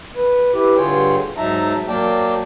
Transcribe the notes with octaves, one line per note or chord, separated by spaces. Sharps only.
B4
E4 G4 B4
G2 D3 F4 G#4 C#5 G5
G#2 F#3 D#4 E5 A5 A#5
F#3 A#3 D5 G5 A5